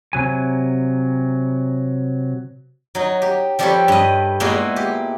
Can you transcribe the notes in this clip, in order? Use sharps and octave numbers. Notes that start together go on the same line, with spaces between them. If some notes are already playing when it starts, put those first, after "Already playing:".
C3 F#3 G#5
F#3 D#4
G4
F3 G3 G4 A4 B4 C#5
G2 D#5
A#2 G#3 A#3 B3 E4 F#4
G4